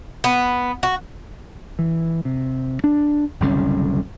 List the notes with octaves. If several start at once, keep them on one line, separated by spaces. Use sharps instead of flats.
B3
F#4
E3
C3
D4
F#1 C2 D3 C#4